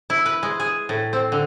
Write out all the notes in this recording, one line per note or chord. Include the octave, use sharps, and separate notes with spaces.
E4
B4
G#3
G#4
A2
C4
D3